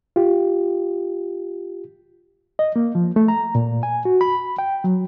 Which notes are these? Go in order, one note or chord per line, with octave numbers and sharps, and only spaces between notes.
F4 G4
D#5
A#3
F3
A3
A#5
A#2
G#5
F#4
B5
G5
F#3